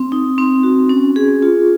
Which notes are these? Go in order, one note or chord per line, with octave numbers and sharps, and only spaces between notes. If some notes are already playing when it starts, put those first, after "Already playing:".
Already playing: C4
D#4
C4
F#4
C#4
G#4
F4